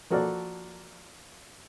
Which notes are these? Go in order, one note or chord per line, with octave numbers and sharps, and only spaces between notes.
F3 A#3 F#4 A4 A#4 D5